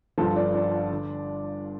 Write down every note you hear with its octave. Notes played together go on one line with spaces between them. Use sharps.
G1 G2 F3 A4
D4
D4
D3